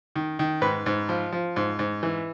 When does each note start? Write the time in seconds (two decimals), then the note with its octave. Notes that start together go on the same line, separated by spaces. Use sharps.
0.16 D#3
0.39 D#3
0.61 G#2 B4
0.86 G#2
1.09 F3
1.32 F3
1.56 G#2
1.79 G#2
2.03 E3